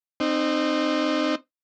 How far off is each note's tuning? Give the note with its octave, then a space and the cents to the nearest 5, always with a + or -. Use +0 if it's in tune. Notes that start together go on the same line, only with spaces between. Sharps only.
C4 +0 D#4 -25